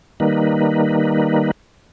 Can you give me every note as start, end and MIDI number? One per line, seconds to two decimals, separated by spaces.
0.20 1.51 51
0.20 1.51 55
0.20 1.51 58
0.20 1.51 63
0.20 1.51 71